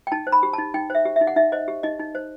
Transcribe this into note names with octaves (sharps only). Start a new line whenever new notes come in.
G5
D#4 A5
C5
B5
G4
D#4 A5
D#4 G5
C5 E5
G4
D#4 E5
F#5
D#4 E5
C5 D#5
G4
D#4 D#5
D#4
C5